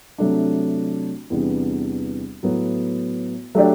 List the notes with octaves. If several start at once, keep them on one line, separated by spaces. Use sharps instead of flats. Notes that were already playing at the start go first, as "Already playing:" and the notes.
C3 F#3 A3 D4
E2 C3 G3 B3 D4
A2 F#3 B3
F#3 A3 D4 G4 D5